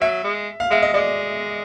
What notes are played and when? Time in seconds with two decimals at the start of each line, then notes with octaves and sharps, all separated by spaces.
0.01 F#3 E5
0.24 G#3
0.60 F5
0.71 G#3 E5
0.82 D#5
0.94 G#3 D5